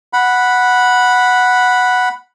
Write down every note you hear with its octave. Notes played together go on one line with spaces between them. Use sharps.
F#5 B5